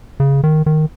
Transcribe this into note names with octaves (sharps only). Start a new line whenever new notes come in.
C#3
D#3
D#3